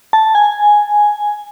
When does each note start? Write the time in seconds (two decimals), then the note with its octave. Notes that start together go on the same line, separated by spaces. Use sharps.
0.13 A5
0.35 G#5